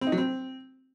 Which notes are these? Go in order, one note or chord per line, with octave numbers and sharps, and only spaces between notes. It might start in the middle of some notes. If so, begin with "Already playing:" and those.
C4
D#4
F#3
C4